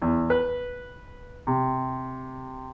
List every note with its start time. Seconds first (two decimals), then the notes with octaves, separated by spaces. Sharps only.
0.02 E2
0.30 B4
1.47 C3